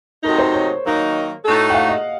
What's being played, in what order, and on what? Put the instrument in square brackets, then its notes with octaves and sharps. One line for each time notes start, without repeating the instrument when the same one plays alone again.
[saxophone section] C3 F#3 A3 D#4 [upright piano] A#4
[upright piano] C5
C#5
[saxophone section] D#3 F#3 A#3 D#4
A2 A3 D#4 F#4 A4
[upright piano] F#5
F5
D#5